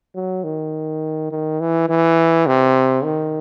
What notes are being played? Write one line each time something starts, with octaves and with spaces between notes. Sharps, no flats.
F#3
D#3
D#3
E3
E3
C3
D#3